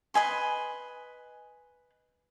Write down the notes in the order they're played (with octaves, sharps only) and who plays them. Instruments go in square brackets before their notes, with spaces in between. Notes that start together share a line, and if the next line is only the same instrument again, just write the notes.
[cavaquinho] B4 D#5 G#5 C6